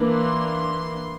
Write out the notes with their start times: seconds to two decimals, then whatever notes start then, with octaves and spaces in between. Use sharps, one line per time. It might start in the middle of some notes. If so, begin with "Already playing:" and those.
Already playing: E3 A#3 D4
0.11 C6